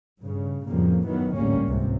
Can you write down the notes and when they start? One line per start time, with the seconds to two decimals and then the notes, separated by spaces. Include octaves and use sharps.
0.21 G2 C#3
0.67 F2 A2 C#3 F3 G3 A#3
1.06 F#2 D#3 E3 F#3 B3
1.35 A1 D2 G#2 G3 A#3 C#4
1.66 C#2 G#2 C3